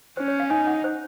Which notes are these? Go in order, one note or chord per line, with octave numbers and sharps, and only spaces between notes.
C#4 C5
C#5
F5
D#4 G#5
F#5
C5